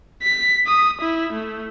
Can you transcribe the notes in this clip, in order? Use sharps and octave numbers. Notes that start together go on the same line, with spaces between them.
B6
D#6
E4
A3